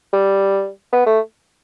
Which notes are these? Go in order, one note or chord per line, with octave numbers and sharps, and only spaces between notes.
G3
B3
A3